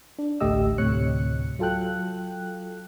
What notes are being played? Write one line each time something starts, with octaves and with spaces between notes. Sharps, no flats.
D4
A1 D2 A3 G4 D#5 E6
D2 A2 C3 C#5 F#6 C#7
F#3 F4 A4 G5 F#6